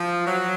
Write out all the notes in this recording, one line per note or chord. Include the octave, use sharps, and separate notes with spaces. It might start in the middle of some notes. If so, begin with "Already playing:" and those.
Already playing: F3
F#3